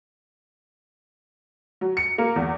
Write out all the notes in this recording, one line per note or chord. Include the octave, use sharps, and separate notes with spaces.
F#3
C#7
A#3
E2